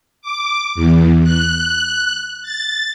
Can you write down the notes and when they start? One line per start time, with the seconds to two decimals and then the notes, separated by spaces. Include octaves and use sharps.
0.22 D6
0.75 E2
1.23 F#6
2.43 A6